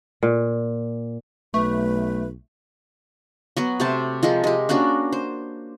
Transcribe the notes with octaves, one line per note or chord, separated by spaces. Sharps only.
A#2
B1 A3 B4 C#6
F#3 B3 F#4
C3 A3 C5 A5
F3 G#3 A4 A#4
G#3 G4
A#3 C#4 D4 F#4
C5